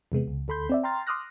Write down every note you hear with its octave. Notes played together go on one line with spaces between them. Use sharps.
E2 C3 G#3 B3
C#2
D2 A4 B5 C6 G6
C4 D5 E5
G5 A#5 C6 F6 A6
C6 D6 D#6 F6 F#6 A#6